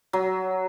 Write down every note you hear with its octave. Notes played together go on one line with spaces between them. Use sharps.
F#3